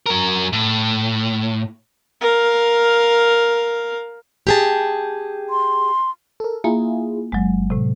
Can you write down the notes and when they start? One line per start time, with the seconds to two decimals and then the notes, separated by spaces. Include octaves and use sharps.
0.06 F#3 A#4
0.53 A2
2.21 A#4 F5
4.47 G4 G#4 A5
5.50 C6
6.40 A4 A#4
6.64 A#3 E4 F4 G#4
7.32 G1 F#3 G#3
7.70 A2 C3